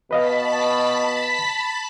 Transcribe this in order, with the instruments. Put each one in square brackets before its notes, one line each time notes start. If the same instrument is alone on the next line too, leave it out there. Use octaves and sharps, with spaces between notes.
[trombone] B2 [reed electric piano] B4 D#5 F5 [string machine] A5 B5 B6